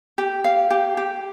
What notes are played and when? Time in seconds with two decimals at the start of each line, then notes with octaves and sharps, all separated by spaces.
0.18 G4
0.44 F5
0.70 G4
0.97 G4